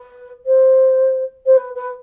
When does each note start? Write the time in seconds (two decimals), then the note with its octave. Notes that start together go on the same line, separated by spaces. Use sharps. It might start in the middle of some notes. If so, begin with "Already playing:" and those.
Already playing: B4
0.46 C5
1.46 C5
1.57 B4
1.75 B4